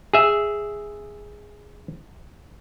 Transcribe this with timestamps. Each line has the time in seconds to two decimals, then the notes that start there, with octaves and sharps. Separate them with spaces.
0.14 G#4 E5